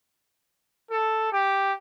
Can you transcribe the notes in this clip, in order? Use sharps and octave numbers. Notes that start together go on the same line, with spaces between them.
A4
G4